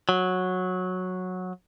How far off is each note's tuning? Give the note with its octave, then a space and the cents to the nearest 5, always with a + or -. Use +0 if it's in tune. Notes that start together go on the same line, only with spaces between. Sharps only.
F#3 -10